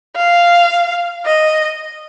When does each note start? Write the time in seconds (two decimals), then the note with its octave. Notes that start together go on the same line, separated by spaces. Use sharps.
0.16 F5
1.26 D#5